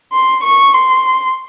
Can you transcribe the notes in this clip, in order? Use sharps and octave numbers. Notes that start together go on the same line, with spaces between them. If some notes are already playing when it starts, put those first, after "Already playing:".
C6
C#6
C6